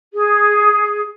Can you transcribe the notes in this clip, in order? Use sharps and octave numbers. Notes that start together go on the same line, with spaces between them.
G#4